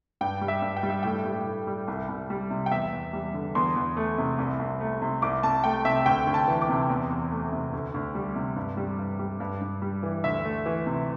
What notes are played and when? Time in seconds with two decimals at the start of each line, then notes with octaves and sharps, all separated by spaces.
0.21 G2 G5
0.41 G3
0.48 E5
0.62 G2
0.76 G5
0.83 G3
0.90 E5
1.03 A2 G5
1.26 G3
1.46 A2
1.67 G3
1.88 C2
2.09 C2
2.30 G3
2.50 C3
2.66 G5
2.71 E2 E5
2.93 E2
3.13 G3
3.34 D3
3.55 E2 C6
3.76 E2
3.97 A3
4.18 C3
4.38 C2
4.59 C2
4.80 A3
5.02 C3
5.22 C2 D6
5.43 C2 A5
5.64 A3 G5
5.85 C3 E5
6.06 D2 G5
6.27 D2
6.34 A5
6.48 E3
6.62 D6
6.69 C3
6.89 E2
7.10 E2
7.31 A3
7.52 C3
7.73 D2
7.94 D2
8.15 G3
8.35 C3
8.56 G2
8.77 G3
8.98 G2
9.19 G3
9.40 G2
9.61 G2
9.82 G3
10.03 E3
10.24 D2 E5
10.44 A3
10.66 E3
10.87 C3